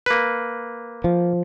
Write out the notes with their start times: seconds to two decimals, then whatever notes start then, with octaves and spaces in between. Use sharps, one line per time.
0.06 A#3 B4
1.04 F3